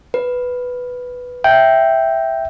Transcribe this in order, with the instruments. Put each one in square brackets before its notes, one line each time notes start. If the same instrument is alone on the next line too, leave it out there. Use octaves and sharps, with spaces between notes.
[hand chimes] B4
[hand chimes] E5 [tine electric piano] G5